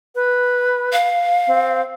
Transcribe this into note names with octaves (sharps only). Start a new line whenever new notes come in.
B4
F5
C4